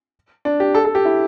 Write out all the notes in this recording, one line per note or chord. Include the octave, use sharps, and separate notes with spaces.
D4
G4
A4
A4
G4
E4